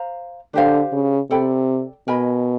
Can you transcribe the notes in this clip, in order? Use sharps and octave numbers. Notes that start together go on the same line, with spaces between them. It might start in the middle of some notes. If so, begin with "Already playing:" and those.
Already playing: C5 F5 A#5
D3 D4 G4 C5 F5
C#3
C3 A4 D5 G5 B5
B2 A#4 D#5 G#5 B5